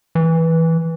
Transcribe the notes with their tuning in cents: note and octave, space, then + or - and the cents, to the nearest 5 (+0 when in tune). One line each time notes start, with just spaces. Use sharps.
E3 -10